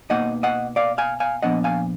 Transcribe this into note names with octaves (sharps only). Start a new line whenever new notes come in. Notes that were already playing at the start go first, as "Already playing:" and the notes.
B2 A#3 D#4 D#5 F#5
D#5 F#5
D5 F5
F5 G#5
F5 G#5
A#2 F3 B3 D4 D#5 F#5
F5 G#5